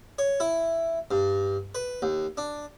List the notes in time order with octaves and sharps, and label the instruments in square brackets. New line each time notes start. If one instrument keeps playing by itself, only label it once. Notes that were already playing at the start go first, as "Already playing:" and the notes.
[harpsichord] C#5
E4
G2
B4
D#2
D4